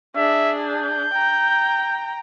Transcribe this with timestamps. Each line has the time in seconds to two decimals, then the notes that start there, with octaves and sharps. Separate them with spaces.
0.16 D4 G#4 E5
0.66 G6
1.13 G5 A#5